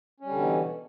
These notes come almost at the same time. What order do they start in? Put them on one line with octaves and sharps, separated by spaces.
C#4 G3 D3 B2 E3